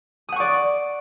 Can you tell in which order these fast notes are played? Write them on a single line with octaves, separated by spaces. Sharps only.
D#6 F#5 C#6 D5